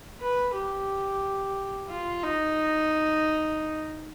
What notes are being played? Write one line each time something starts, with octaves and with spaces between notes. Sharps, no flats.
B4
G4
F4
D#4